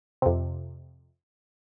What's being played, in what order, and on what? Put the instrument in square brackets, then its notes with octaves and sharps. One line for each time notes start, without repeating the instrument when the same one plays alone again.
[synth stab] F2 C3